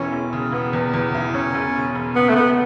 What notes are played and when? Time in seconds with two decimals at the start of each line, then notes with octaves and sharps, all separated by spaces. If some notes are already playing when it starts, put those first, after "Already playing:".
Already playing: E1 E3 C#4
0.12 E1
0.33 C#3
0.52 E1 B3
0.73 E2
0.94 E2
1.14 E3
1.34 E1 C#4
1.55 E1
1.76 C#3
1.95 E1
2.15 C#3 B3
2.29 A3
2.36 E1 B3